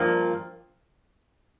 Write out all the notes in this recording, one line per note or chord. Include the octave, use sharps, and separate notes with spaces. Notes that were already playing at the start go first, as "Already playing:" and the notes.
Already playing: G2 F3 A#3